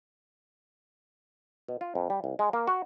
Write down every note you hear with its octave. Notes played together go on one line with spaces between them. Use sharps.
B2
F4
F2
G3
C2
G#3
A#3
F#4